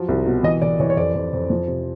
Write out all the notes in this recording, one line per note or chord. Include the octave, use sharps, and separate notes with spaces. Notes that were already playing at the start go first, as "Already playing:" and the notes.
Already playing: F3 F#3
C2
B2
E3 D#5
E3 D5
E3 C#5
C#5
F2 D5
F2
F2
F3
C3